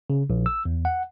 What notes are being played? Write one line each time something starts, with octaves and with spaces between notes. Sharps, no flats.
C#3
A#1
E6
E2
F#5